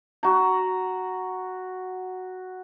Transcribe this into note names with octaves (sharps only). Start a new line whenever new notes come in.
F#4 A#5